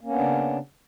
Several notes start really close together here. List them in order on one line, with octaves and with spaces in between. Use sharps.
A#3 C#4 B3 D4 C#3